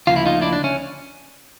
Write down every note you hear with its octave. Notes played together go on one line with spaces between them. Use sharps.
D2 C#3 F3 A#3 F4
E4
D#4 F4
D4 E4
D4
C#4